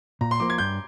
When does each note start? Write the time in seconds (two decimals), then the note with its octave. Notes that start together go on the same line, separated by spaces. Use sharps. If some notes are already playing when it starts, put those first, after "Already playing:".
0.21 A#2 A#5
0.31 C6
0.40 F3 A#3 D6
0.50 G#6
0.58 G2 G6